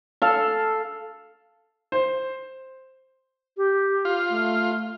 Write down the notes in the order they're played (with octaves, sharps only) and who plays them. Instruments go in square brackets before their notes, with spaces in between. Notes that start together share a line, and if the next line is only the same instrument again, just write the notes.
[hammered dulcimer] A4 F5
[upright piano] C5
[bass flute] G4
[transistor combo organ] F4
[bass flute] A3